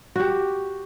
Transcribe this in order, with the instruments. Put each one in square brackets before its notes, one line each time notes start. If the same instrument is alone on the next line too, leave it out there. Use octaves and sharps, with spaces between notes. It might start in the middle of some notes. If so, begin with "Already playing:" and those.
[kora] F#4 G4